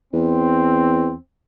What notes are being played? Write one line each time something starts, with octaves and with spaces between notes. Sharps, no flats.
E2 C4